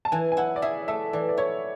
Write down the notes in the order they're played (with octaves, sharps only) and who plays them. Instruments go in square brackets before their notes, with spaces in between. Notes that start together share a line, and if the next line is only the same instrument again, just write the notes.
[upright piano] A5
[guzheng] E3 [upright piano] G#5
[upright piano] G#5
[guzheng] E4 [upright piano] F#5
[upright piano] D5
[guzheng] G#4 [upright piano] E5
[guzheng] A3 [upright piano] E5
[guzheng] E3 [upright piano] D5
[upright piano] D5
[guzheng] E4 [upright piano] C#5